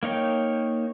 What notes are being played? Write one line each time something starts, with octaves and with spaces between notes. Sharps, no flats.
A#3 D#4 C#5 G5